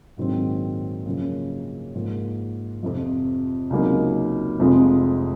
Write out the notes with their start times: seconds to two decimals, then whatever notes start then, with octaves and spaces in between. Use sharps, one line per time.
0.17 A#1 G#2 D#3 F#3 C4
1.06 F#2 C#3 F3 A#3
1.94 G#2 F3 A#3
2.83 F2 C3 F3
3.70 C#2 C3 F#3 A#3 D#4
4.60 F1 F2 C3 F3 G#3